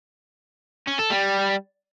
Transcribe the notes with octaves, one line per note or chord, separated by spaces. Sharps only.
C#4
A4
G3